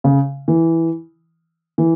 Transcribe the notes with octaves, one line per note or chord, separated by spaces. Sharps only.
C#3
E3
E3